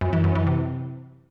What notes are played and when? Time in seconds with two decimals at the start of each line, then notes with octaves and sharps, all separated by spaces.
0.01 F#2
0.13 E3
0.24 F#2
0.35 E3
0.47 C3